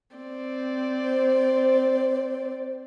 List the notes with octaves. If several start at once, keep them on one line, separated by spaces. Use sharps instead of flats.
C4 D5
C5